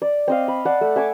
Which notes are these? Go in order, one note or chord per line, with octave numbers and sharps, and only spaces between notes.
D5
C4 D#5 F5
B5
D5 F#5 A5
A3
E5 G#5 C#6 D6